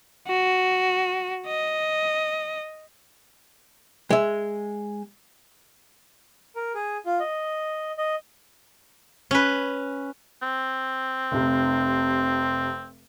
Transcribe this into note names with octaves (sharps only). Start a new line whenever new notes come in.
F#4
D#5
G#3 E5
A#4
G#4
F4
D#5
D#5
C#4 B4
C4
F1 C3